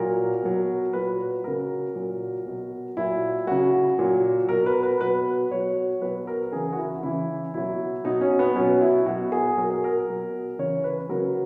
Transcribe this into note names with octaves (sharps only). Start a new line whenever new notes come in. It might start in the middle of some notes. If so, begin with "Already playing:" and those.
Already playing: A#2 F#3 A#4
B2 F#3
A#2 F#3 B4
C#3 F#3 A#4
A#2 F#3
B2 F#3
A#2 F#3 E4
C#3 F#3 F#4
A#2 F#3
B2 F#3 A#4
B4
B4
B2 F#3 B4
B2 F#3 C#5
B2 F#3 B4
A#4
C#3 E3 G#4
F#4
E4
C#3 E3 E4
B2 F#3 E4
B2 F#3 D#4
C#4
B3
B2 F#3 C#4
E4
B2 F#3 F#4
G#4
B2 F#3 A#4
G#4
A#4
B2 F#3
C#3 E3 C#5
B4
C#3 F#3 A#4